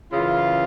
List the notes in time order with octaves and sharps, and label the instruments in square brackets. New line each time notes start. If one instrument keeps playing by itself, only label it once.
[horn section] F#2 C#3 E3 F4